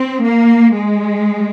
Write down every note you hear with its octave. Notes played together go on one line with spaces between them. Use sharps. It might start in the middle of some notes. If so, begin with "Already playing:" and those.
Already playing: C4
A#3
G#3